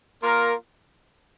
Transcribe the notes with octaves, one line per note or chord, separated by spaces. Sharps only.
A#3 F4 A#4